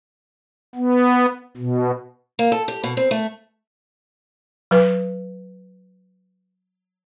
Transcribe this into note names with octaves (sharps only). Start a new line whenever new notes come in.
B3
B2
A#3
A4
G4
B2
C4
A3
F#3 B4